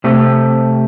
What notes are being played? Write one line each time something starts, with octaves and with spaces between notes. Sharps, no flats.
C3 A3 G4